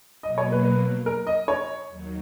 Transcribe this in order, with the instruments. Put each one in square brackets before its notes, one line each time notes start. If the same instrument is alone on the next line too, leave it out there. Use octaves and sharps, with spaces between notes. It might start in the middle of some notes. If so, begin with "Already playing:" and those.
[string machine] B2 F#3 A#3 [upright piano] D#5
[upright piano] C#5
B4
B4
A#4
D#5
C#5
[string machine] D#2 D#3 F#3